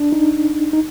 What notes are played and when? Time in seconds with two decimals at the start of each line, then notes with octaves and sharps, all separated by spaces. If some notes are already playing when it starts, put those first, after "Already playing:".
Already playing: D4
0.12 D#4
0.73 D#4